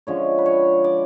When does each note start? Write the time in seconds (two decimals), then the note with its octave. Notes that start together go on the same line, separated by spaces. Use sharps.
0.07 D3 F3 G#3 C#4 C#5
0.38 B4
0.46 C#5
0.84 D5